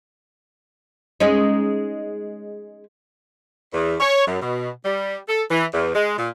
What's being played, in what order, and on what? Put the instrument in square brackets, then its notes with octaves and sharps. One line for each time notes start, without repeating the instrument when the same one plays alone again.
[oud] G#3 C#4 D#4
[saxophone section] E2
C#5
F#2
B2
G3
A4
E3
E2
G#3
A#2